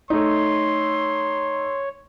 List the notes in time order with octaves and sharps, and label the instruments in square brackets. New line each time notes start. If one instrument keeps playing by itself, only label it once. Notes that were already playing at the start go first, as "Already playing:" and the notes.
[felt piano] A3 D#4 [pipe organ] C#5 [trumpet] C6